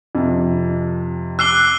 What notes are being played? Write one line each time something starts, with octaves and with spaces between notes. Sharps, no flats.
F2 C3
D6 E6 F#6 C7 G7